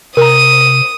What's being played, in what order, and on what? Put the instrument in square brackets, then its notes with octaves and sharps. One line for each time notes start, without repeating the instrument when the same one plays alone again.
[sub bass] C3 [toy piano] A#4 A#5 [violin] D#6 D#7